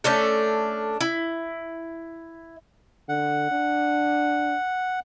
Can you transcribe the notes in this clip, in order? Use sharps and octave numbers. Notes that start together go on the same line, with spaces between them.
A3 C#4 D4 A4
E4
D3 F#5
D4